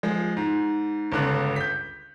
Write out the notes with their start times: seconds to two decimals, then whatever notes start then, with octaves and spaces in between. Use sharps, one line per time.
0.03 F3 G#3
0.37 G#2
1.12 G1 C#2 F#6
1.56 G6 B6